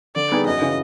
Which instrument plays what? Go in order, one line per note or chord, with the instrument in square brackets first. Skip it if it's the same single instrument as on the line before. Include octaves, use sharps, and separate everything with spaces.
[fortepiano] D3 [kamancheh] D5
[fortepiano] G3 B3 D#4 G#4
[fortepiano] F#2 [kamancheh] D#5
[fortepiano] C#3 E3